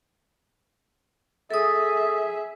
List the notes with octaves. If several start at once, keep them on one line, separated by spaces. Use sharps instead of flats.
G#4 A4 E5 D#6